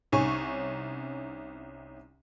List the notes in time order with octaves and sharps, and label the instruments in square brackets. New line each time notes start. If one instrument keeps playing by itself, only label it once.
[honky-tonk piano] C2 C#4 D#4 G#5 C#6